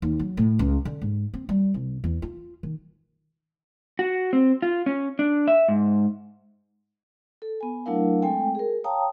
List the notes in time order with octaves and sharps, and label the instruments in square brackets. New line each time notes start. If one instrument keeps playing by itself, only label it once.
[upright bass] D#2
F#3
A2
C#2
D3
G#2
C4
G3
C2
E2
F4
D#3
[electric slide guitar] F#4
C4
F4
C#4
D4
E5
G#2
[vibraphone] A4
B3 G#5
F#3 A3 D4 E4 A#4 F5
G#3 A3 C4 A4 G5 G#5
G#4 A#4
C#5 F5 G5 A5 A#5 D#6